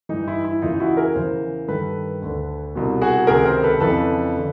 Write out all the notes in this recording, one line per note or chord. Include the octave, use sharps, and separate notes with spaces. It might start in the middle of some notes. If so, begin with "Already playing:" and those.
G2 E3 D#4
E4
E4
E2 C#3 E3 D#4 F4
E4 F#4
G#4 A#4
E2 C#3 E3 A#4 C5
G2 D#3 A4 B4
D2 D3
C2 B2
F#4 G#4
C#2 C3 D#3 G#4 A#4
A#4 C5
A4 B4
F2 C#3 E3 A4 B4
D3